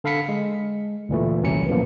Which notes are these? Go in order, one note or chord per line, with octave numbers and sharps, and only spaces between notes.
D3 A4 F5 B5 B6 C#7
G#3
D2 A#2 E3 A3
G1 C2 F#2 E3 F#3 C#7
F#2 A#2 F3 A#3 B3